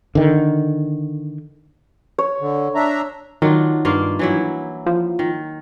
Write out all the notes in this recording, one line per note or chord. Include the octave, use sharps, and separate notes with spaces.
D3 D#3
C#5
D3
D4 E5 A#5
D#3 F#3 D4 F4
G2 A#3 F4
E3 F#3 E4
F3
D#3